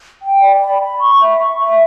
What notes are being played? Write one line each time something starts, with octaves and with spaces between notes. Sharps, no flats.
G5
D5
B5
B5
C#6
E5
C#6
E5